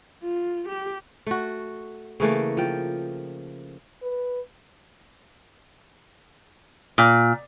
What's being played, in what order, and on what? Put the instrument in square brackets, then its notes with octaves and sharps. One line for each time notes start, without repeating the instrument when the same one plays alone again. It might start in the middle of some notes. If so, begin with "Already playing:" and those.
[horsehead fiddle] F4
G4
[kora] A3 F#4
C#3 E3 A3 A#3
F3 G5
[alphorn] B4
[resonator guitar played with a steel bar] A#2